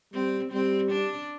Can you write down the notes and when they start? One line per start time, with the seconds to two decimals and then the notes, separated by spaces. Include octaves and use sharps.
0.13 G3 C4
0.52 G3 C4
0.92 D4